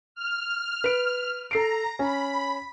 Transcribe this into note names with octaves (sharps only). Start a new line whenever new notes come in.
F6
B4 D7
A4 A#5 C7 D7
C#4 B5